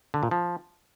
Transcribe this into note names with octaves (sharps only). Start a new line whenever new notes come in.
D3
A#2
F3